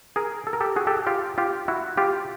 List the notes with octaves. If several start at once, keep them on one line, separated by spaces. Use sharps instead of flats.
G#4 A#4
A4
A#4
G4 A4
F#4 G#4
G4 A4
F4 G4
F4 G4
E4 F#4
F4 G4